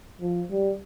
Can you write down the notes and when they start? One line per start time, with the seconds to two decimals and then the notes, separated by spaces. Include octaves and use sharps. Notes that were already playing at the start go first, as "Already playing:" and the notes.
0.21 F3
0.50 G3